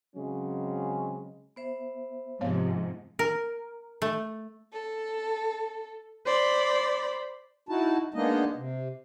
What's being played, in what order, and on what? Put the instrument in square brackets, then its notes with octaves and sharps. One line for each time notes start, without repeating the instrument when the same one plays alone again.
[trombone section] C#3 F#3 G#3 C4 C#4
[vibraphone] B3 C5 E5
[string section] G#2 C3 F3 [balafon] B3 C#5 F5
[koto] A#4
A3
[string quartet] A4
C5 D5 B5
[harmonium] D#4 E4 F#4 A5
G#3 A#3 B3 D4 D#4 D#5
C3